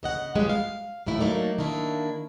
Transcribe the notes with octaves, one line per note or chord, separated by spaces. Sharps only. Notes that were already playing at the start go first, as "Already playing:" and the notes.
C#3 D#5 F#5
G3 G#3 B3 C#4 F4 G4
F5
D#2 A2 A3 E4
F#3 A3 A#3 D#4 D5
D#3 A#3 D4 E4